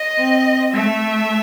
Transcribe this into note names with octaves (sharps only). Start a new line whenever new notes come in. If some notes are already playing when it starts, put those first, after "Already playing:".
Already playing: D#5
C4
A3 E5